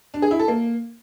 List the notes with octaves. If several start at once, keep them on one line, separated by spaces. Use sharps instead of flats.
D4
G#4
E4
A4
A#3